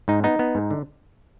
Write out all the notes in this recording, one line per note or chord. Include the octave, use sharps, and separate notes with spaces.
G#2 D#4
B3 D#4
B3
G#2
D3